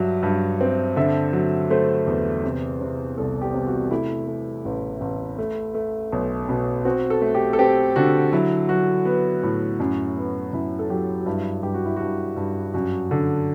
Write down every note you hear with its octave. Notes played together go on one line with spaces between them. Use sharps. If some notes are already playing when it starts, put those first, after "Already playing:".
Already playing: G2 F#3 E5
G2
C4
D3 E5
F#3
A3 C5
E2
C3
C3
C2 A4
G4
C3
F#4
A3 E4
A3
A1
A1
A3
A3
B1
B2
C4 F#4
A4
A3
G4
A4
C4 G4
D3 F#4
F#3 E4
F#3 F#4
B3
A2
F#2
B3
F#2 E4
A4
F#3 G4
F#4
G2 E4
G2 G4
F#4
E4
G2 F#4
G2
F#2 F#4
D3